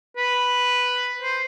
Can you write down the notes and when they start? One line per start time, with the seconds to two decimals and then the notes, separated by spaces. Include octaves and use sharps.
0.17 B4
1.22 C5